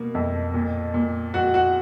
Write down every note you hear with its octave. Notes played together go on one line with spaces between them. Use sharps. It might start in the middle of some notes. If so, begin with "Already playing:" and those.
Already playing: B2 A#3
F2
A#2
A#2
F2 F#4 F#5
F#4 F#5